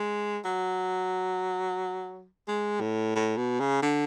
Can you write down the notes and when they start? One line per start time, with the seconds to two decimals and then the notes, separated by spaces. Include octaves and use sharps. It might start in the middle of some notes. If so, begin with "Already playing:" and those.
Already playing: G#3
0.45 F#3
2.48 G#3
2.81 A2
3.16 A2
3.37 B2
3.60 C#3
3.83 D3